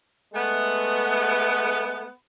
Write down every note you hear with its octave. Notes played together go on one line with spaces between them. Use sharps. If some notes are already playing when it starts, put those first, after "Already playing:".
G#3 A3 B3